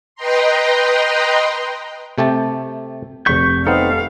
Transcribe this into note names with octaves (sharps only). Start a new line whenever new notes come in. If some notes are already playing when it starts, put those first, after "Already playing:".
B4 D#5 G5 A#5 C6
C3 A3 G4 A5
F1 C#6 G6 B6
B3 C4 D#4 A4 F5